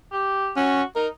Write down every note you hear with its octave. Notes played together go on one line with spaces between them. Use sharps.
G4
C#4 F#4
D#4 A#4